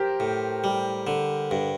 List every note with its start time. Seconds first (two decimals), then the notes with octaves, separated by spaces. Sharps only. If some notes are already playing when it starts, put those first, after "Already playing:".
Already playing: G4 A#4 C5
0.20 A2
0.64 G3
1.07 D3
1.51 G2